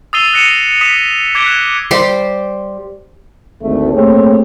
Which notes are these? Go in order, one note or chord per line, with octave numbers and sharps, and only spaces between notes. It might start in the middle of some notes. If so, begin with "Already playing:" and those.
D#6 E6 A6 C7 D#7 G7
F#6 A#6 C#7 D#7 E7
D#6 B6 E7
D6 G#6 B6 C#7 D7 G7
F#6 G#6 E7
G3 G4 C5
G#1 D2 A3
A3 A#3 C4 G4 G#4 C#5